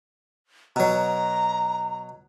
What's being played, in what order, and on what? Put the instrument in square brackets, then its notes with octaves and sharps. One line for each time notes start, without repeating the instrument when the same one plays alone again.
[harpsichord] B2 F#3 [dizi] A#5